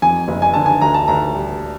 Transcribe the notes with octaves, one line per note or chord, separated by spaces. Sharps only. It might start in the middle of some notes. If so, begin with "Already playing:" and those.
F2 G#5
F#1
G#5
D3 A5
G#5
D2 A#5
A5
D2 A#5
G3